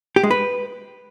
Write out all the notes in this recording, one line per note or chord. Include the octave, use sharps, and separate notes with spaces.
G4
G#3
B4